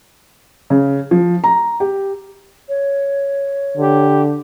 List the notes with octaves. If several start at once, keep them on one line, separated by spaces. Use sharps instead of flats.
C#3
F3
A#5
G4
C#5
D3 G4